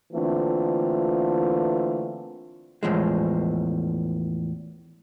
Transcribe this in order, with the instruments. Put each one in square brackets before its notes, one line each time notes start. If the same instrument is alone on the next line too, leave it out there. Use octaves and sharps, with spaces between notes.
[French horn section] D3 E3 A3 A#3 C4 F4
[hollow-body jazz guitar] E2 A2 F3 G#3